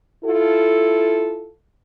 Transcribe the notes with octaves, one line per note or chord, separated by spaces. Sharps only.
E4 F4 A4